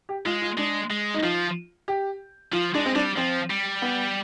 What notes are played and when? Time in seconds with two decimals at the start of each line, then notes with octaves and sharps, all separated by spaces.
0.09 G4
0.25 G#3 F4
0.42 F4
0.58 G#3 D4
0.90 G#3
1.14 D#4
1.23 F3 F4
1.88 G4
2.52 F3 F4
2.75 G#3 D4
2.86 C4
2.95 G3 D4
3.17 F3 C4
3.50 G3
3.82 B3